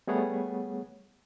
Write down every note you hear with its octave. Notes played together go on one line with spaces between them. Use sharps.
G3 A3 B3 G#4 C#5 F#5